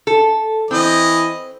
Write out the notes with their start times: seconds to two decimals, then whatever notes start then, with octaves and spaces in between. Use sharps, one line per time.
0.07 A4
0.71 E3 C4 D#5